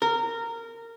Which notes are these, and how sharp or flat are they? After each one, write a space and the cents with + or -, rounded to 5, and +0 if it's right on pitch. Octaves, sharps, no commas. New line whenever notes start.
A#4 -20